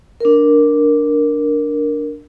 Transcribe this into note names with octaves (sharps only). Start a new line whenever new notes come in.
D4 A#4